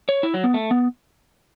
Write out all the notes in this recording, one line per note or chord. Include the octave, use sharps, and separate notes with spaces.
C#5
E4
F#3
B3
A3
B3